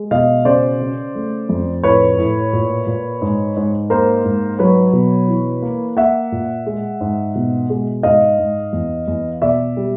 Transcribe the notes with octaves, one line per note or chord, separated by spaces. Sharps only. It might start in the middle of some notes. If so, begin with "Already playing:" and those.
Already playing: G#3
B2 D#5 F5
C#3 C5 D5
C#3
A3
F2
A2 B4 C#5
A2
A#2
A#2
G#2
G#2
A#3 A#4 C5
G#2
F#3 B4 C#5
B2
E3
A#3
A#3 E5 F#5
A#2
G#3
G#2
B2
G#3
G#2 D#5 F5
G#2
E2
E2
B2 D5 E5
G3